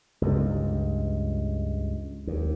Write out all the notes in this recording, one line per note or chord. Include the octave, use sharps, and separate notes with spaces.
C#2 G2
D#2